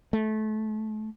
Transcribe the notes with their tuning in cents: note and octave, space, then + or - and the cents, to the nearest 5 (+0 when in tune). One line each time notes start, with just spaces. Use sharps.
A3 -25